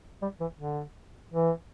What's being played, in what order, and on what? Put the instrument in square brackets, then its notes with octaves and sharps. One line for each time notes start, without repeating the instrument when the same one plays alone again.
[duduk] G3
E3
D3
E3